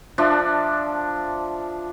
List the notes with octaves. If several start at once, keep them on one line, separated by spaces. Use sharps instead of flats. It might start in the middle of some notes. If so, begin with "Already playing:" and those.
F3 D4 D5 E5